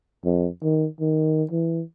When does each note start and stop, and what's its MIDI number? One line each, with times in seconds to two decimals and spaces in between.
0.25 0.48 41
0.63 0.87 51
1.00 1.43 51
1.51 1.82 52